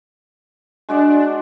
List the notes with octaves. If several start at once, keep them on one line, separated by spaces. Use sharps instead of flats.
G#3 D4 F#4 D5